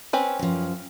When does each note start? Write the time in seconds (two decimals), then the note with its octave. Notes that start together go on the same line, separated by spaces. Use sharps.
0.13 C4 C#4 B4
0.39 F#2 F3